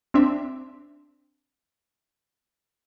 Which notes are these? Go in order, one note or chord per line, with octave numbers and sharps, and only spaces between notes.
C4 D4 E5